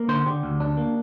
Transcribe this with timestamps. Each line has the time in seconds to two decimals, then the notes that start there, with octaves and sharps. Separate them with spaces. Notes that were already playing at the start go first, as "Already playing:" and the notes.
Already playing: A#3
0.08 D3 C5
0.26 D3 G4
0.43 D2
0.60 D4
0.77 A#3